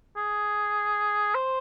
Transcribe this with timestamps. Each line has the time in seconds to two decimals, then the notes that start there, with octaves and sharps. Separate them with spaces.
0.16 G#4
1.35 C5